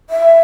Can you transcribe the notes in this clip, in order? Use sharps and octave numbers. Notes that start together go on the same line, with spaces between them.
E5